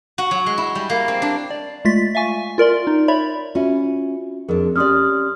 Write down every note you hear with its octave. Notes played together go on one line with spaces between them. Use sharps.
F#4
F#3
G#3
E4
G3
A#3
C4
D4
D5
G#3 A3 F4 A6 B6
E5 F5 G#5 C#6
F4 A#4 D5 C6
D#4
C#5 D5 E5 B5
C#4 F4 F#4 E5
F2 D4 G#4 A#4
C#4 G4 D5 C6 D#6 F6